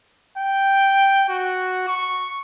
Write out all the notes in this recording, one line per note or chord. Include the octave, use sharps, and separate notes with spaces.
G5
F#4
C#6